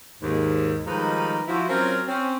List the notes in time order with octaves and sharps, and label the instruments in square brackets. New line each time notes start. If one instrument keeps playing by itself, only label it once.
[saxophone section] D#2 G#2
D#3 F3 G3 G#3 D#4 B4
F3 E4 F#4
F#3 C4 C#4 F4 A#4
C4 C#4